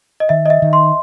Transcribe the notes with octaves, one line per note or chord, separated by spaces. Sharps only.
D#5
D#3 E5
D#5
E5
D#3
C6